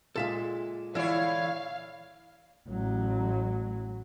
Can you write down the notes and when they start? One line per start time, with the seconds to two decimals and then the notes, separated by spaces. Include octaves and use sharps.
0.16 A#2 G#3 A4 E5 F5
0.95 D3 E3 E4 C#5 F5
2.69 A1 F#3